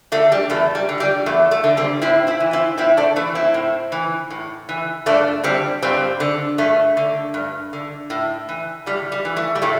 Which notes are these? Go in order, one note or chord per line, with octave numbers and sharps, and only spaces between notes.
D3 A3
G3
E2 A3
G3
D3
G3
E2 A3
A3
D3
G3 C4
A2 C4 E4
C4 E4
E3
C4 E4
A2 C4 E4
A3 D4
E3 A3
C4 E4
A2
E3
A2
E3
G2 A3 D4
D3 G3 C4
G2 G3 C4
D3
G2 A3
D3
G2
D3
A2
E3
A2 G3
G3
E3
A3
G3
A2 A3